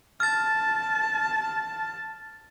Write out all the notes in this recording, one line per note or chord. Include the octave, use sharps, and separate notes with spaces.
A5 F6 A6